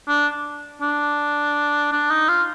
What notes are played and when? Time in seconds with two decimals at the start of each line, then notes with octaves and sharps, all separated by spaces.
0.08 D4
0.81 D4
1.92 D4
2.10 D#4
2.29 F4